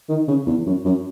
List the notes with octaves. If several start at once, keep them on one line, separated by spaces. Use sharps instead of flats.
D#3
C#3
E2
F#2
F#2